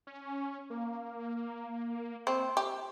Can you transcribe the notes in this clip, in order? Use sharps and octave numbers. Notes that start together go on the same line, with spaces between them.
C#4
A#3
C4
G4